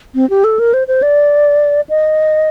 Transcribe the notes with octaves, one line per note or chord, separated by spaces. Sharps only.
C4
G4
A4
A#4
C5
C5
D5
D#5